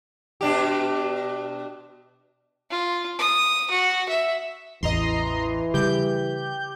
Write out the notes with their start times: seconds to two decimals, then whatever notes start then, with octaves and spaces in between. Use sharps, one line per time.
0.41 B2 D4 G4
2.70 F4
3.19 D#6
3.71 F#4
4.09 E5
4.83 A1 E2 E3 D#5 A#5 C6
5.74 C#3 G3 G4 G6